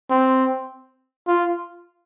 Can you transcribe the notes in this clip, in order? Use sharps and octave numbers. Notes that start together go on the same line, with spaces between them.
C4
F4